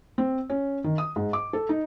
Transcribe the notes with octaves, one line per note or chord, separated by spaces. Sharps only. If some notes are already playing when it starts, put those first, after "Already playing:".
C4
C#4
D#3
D#6
G#2
D6
A4
D#4